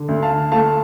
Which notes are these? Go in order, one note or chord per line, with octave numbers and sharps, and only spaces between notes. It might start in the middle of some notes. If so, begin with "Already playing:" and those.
Already playing: D3
D2
F5 A5
A3 F5 A5